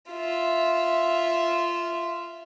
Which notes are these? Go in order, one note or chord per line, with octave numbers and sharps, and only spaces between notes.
F4 E5